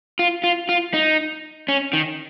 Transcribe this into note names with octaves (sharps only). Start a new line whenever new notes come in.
F4
F4
F4
D#4
C#4
D#3